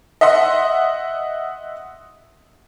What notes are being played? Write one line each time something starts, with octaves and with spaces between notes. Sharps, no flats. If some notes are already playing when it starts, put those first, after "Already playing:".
D#5 E5 F#5 C6